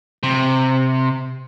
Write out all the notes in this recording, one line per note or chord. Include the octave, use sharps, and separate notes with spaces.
C3